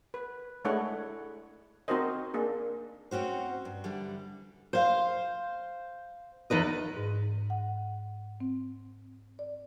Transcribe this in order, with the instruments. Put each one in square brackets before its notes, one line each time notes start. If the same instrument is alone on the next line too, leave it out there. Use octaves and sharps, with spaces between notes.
[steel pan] B4
G#3 A3 D4 E4 C#5 F#5
C4 D#4 F#4 A#4 C5 D#5
A#3 D4 G#4
[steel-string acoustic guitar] C4 C#4 F#4 C5
G2
D3 E3 G3
C5 F5
E2 D#4 B4 D#5
[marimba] G#2
F#5
C4
D5